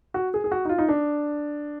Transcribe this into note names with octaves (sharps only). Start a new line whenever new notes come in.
F#4
G#4
G#4
F#4
D#4
F4
D#4
D4